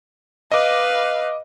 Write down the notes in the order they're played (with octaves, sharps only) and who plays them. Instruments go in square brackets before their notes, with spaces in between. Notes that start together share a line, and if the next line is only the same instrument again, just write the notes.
[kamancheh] B4 F5 [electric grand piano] D#5 D6